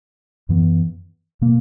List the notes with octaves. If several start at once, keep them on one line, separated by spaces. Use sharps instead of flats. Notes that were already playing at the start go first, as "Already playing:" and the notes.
F#2 E3 B3
B2 A#3